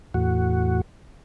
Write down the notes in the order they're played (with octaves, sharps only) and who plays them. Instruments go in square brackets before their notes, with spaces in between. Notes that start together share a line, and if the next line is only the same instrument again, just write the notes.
[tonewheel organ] E2 A2 F#4